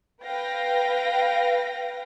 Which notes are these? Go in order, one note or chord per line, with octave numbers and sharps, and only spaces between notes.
B4 F5 G5 A#6